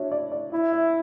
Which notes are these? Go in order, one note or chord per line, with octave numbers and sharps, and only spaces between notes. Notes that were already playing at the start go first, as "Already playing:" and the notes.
Already playing: D4 E4 F#4 C#5
D5
D5
E4 E5
E5